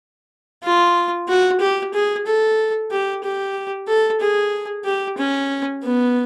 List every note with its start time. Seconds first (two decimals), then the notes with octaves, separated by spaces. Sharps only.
0.64 F4
1.28 F#4
1.60 G4
1.94 G#4
2.26 A4
2.91 G4
3.24 G4
3.88 A4
4.21 G#4
4.85 G4
5.18 C#4
5.83 B3